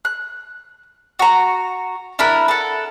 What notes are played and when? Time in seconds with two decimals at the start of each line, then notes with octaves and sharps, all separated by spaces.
0.05 F#6
1.19 F#4 A#5
2.19 D4 E4 A#4 B5
2.48 A4 F#5